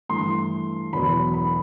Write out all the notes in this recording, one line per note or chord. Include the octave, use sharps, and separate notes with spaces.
G2 E3 A3 C6
E2 B2 F#3 B5
B5